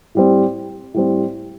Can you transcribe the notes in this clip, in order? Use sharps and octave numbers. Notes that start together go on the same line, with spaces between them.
A2 G3 C4
A2 G3 C4